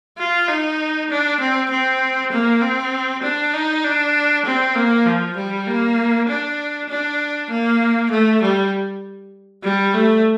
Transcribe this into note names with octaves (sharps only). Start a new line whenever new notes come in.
F4
D#4
D4
C4
C4
A#3
C4
D4
D#4
D4
C4
A#3
F3
G3
A#3
D4
D4
A#3
A3
G3
G3
A3